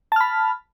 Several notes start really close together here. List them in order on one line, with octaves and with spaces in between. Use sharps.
A5 F6 B5